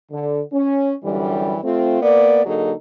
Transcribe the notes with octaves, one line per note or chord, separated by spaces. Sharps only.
D3
C#4
F#2 D3 E3 G3
A3 C4 F4
A#3 B3 A#4 D5
D3 F#3 A#3 D#4 G#4 A4